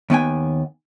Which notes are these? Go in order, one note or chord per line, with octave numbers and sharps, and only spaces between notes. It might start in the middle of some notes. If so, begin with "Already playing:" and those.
D#2 B3 G5 G#5